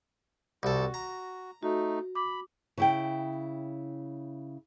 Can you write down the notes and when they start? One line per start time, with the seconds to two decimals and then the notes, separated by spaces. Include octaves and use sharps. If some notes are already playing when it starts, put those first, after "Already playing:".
0.63 C2 F#4 A4
0.94 A#5
1.63 A3 D#4 F#4
2.15 B5 D6
2.78 C#3 E4 G5